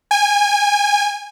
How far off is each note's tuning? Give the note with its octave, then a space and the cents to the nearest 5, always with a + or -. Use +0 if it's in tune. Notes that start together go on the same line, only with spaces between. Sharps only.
G#5 -25